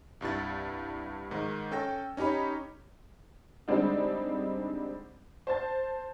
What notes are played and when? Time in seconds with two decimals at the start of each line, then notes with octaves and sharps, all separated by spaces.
0.21 C2 G2 E4 A6
1.31 G#2 D#3
1.71 C#4 A4 G5 A#6
2.17 C#4 D#4 G4 C#5 B5
3.68 D3 G3 G#3 C4 D4 D#4
5.47 C5 A5 A6